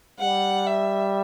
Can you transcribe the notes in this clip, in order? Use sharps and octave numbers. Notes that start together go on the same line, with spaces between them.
G3 F#5
E5